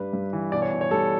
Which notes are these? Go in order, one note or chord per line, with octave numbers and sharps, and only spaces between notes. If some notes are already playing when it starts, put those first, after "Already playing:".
Already playing: G2 G3 B4
G2
E3
B2 D5
C#5
B2
C#5
G3 A4